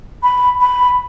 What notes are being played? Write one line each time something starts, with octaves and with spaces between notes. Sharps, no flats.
B5
B5